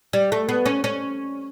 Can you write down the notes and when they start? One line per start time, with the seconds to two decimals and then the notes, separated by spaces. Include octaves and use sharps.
0.13 G3
0.32 A3
0.49 B3
0.66 C#4
0.84 C#4